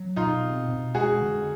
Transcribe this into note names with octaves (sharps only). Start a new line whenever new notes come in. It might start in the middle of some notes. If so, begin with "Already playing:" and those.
Already playing: F#3
B2 D#4 F4
C4
B2
G#3 F#4 G#4
D3